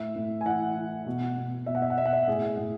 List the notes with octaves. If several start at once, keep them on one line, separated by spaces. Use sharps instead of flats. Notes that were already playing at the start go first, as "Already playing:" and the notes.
Already playing: A2 E5
A2
G#5
E3 F#5
E3
B2
B2
B2 E5
F#5
E5
F#5
B2 E5
F#5
E5
A2 G#4
A2